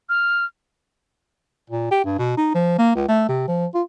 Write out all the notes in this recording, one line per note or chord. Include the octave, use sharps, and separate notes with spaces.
F6
A#2
G4
G2
B2
D#4
F3
A#3
C#2
A3
C3
F3
F4